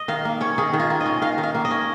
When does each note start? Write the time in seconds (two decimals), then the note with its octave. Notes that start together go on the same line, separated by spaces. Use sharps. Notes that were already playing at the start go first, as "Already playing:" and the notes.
Already playing: D#5
0.08 D#3 F5
0.25 A#3
0.41 C#4 C#5
0.58 D#3 G#4
0.73 D#3
0.80 F4
0.90 A#3
1.01 D#5
1.06 C#4
1.22 D#3 F5
1.38 D#3
1.43 F5
1.55 A#3
1.65 D#5
1.71 C#4